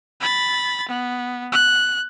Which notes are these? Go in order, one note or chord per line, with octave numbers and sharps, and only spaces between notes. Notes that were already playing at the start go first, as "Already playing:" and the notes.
B5 A6
B3
F#6